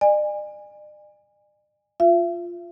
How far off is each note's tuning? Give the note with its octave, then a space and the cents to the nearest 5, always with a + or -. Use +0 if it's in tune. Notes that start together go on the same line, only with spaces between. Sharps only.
D5 +45 G#5 -25
F4 +0 E5 +40